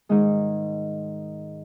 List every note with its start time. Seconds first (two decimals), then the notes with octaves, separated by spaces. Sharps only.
0.09 G#2 D#3 G#3 D#4